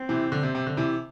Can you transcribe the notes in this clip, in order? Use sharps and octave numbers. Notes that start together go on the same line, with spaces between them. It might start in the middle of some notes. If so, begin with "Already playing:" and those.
Already playing: C4
C3 E3
D3
C3
C3
D3
C3 E3